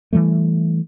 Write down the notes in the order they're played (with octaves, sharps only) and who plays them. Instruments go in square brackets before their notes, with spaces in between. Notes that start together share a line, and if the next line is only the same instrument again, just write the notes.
[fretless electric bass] E3 F3 G3 A3